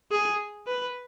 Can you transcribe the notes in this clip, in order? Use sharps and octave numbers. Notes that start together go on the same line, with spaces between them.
G#4
B4